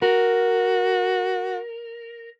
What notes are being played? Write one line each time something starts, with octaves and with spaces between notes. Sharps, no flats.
F#4 A#4